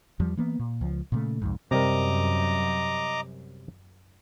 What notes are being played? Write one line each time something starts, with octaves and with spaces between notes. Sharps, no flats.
E2 F3 G3
E3 A#3 B3
A#2
C#2 F3
A#2 C#3 A3
C2 F2 G#2
F#2 C3 G3 A#4 D#5 A#5 D6